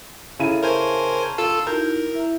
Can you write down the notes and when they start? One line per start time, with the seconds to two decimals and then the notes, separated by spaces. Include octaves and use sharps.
0.39 C#3 E4 A4 A#5 D#7
0.63 A#4 C5 G#5 A5 C#6
1.38 F4 A4 E6
1.67 D#4 E4 F#4 A#4 G6
2.11 E4 E5